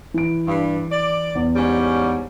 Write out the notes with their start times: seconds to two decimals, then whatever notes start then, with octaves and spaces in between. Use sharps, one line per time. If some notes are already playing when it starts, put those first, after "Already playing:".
0.14 E3 D7
0.48 G2
0.92 D5
1.35 E2
1.56 G#2 G3 C#4